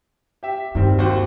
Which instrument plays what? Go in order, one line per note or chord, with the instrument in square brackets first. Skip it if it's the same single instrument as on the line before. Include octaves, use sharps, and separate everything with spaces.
[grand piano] G4 E5
[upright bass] G2 [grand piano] D#3 G3 C4
[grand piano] D#2 F#4 C5